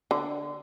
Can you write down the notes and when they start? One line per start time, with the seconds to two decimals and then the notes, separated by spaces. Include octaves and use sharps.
0.11 D3